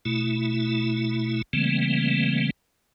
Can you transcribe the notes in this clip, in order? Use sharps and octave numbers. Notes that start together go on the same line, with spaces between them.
B2 A3 E4
C#3 E3 G3 A3 A#3 C4